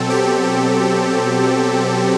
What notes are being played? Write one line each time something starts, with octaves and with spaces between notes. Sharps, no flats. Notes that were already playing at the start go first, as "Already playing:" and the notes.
Already playing: B2 F#3 C4 A4
G4